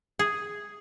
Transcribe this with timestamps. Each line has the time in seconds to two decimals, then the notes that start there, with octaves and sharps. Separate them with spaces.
0.19 G#4